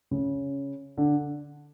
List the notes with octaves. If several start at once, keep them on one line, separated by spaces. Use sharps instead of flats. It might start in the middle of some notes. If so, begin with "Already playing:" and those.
C#3
D3